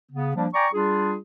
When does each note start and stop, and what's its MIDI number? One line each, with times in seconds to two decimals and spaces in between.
0.12 0.35 49
0.12 0.35 59
0.36 0.48 53
0.36 0.48 55
0.36 0.48 58
0.36 0.48 62
0.54 0.68 74
0.54 0.68 79
0.54 0.68 80
0.54 0.68 82
0.54 0.68 85
0.73 1.18 55
0.73 1.18 62
0.73 1.18 65
0.73 1.18 68